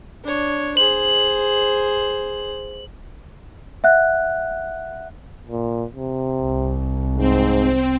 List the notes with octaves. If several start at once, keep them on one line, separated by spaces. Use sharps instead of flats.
D4 C#5
G#4 C5 F#7
E5 F#5 F#6
A#2
C3
C2
G#2 C4